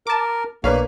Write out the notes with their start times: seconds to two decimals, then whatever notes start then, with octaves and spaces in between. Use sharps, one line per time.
0.07 A#4 A5 D6
0.64 B1 A#3 D4 B4 C#5 F5